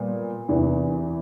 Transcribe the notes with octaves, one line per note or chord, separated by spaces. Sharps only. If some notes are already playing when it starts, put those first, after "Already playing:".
Already playing: A#2 G3 B3
E2 C3 E3